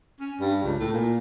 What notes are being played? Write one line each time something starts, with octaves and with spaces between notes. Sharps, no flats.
C#4
G2
C#2
A2
A#2